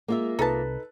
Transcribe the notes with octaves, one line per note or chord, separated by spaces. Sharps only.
G#3 A#3 F4 E5
C2 D#4 A4 B4 A5